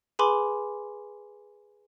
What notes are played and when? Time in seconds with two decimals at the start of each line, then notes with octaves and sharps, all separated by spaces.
0.19 G#4 B4 G#5 B5 C6 D6